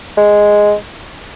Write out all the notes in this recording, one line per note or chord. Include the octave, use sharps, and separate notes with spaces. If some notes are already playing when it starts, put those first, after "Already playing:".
G#3